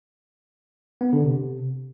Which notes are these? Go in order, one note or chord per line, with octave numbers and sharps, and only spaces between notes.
B3
D3
C3